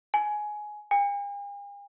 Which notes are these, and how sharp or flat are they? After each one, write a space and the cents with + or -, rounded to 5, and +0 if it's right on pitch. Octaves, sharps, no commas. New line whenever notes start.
G#5 +15
G#5 -45